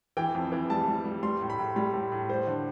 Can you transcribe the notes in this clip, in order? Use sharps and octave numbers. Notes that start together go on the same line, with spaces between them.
E3 G5
F2
E3
G3 A5
G3
G3
G3 C6
A2
B5
A2
G3 B5
A2
A2
G3 C5
D3